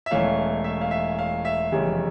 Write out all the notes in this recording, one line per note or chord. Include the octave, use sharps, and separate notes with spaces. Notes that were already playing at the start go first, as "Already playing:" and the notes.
E5
E1 E2 E3 A3 C#4 F5
E5
F5
E5
F5
E5
F1 E2 C#3 G3